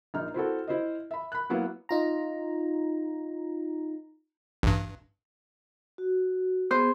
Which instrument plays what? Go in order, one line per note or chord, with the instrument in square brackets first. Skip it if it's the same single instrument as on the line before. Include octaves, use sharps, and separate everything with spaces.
[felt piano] A#1 D#4 F6
C4 E4 F#4 A4
E4 C5 D#5
E5 B5
B5 F#6
F#3 A#3 B3 E4 F#4
[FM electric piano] D#4 F4 A#5
[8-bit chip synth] A1 G2
[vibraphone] F#4
[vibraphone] B3 G#4 [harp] C5